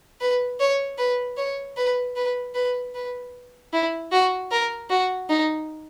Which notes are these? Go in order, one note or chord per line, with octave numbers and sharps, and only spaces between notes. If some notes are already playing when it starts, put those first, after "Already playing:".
B4
C#5
B4
C#5
B4
B4
B4
B4
E4
F#4
A#4
F#4
D#4